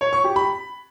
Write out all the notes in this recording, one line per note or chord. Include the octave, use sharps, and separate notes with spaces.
C#5
C#6
G4
B5